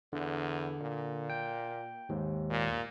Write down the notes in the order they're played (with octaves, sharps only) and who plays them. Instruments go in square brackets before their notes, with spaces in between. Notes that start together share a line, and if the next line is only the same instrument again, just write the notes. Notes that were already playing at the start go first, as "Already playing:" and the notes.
[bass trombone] E2 [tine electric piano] D3
[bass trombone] A#2
[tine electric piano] G5
D#2 G#2
[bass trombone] A#2